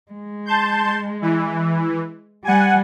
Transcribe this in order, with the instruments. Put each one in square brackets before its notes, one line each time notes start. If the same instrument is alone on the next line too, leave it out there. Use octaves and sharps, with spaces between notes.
[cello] G#3
[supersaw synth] A5 C6 G6
E3
[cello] G3 [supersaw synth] F#5 G#5